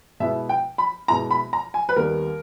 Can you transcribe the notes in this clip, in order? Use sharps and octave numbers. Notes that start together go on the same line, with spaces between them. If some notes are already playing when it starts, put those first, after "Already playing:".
B2 G#3 B3 E4 E5
G5
B5
B2 G#3 B3 E4 A#5
B5
A#5
G#5
B4
D#2 D#3 G3 B3 A#4